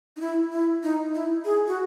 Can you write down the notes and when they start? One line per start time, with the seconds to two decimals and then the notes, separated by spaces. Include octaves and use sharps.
0.16 D#4
0.21 E4
0.52 E4
0.83 D#4
1.15 E4
1.45 G#4
1.67 F#4